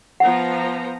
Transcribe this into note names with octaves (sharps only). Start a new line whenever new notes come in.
F3 B3 F#5 A#5